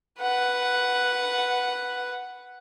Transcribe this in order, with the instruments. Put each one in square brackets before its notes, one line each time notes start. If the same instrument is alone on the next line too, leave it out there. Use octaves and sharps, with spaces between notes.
[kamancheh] B4 F#5